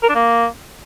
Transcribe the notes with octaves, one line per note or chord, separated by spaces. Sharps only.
A#4
D4
A#3